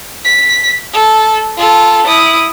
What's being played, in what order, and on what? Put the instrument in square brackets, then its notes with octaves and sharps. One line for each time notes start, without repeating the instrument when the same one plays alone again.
[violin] B6
A4
F4 A4
E4 D#6